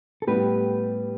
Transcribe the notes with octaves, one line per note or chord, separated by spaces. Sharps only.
A4
A2 G3 B3 G4 B4